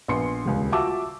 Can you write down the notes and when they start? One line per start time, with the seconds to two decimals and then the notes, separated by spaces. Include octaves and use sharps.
0.08 A#1 B3 C6 C#7
0.45 D#1 C#2
0.72 F4 F#4 E5 A5 D6 E6